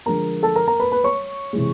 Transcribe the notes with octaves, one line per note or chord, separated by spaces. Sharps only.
D3 F3 G#3 A#4 A#5
A4 A5
A#4 A#5
A#4 A#5
B4 B5
B4 B5
C#5 C#6
C3 E3 G#3